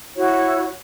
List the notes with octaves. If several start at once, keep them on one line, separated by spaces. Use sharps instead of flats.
E4 F#4 C#5